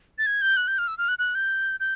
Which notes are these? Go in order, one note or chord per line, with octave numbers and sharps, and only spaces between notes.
A6
G#6
G6
F#6
G6
F6
E6
F6
F#6
F#6
G6
G6